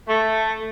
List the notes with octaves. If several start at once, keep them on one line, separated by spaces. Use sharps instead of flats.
A3